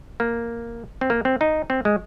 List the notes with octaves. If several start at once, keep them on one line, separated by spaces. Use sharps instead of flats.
A#3
C4
A#3
C4
D#4
C4
G#3